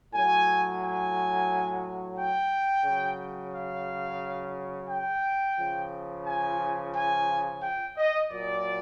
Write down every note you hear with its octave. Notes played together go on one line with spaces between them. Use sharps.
A2 F#3 G#5
G#5
G5
C#3 F#3
F5
G5
C#3 F3
G#5
G#5
G5
D#5
A#2 F#3 D5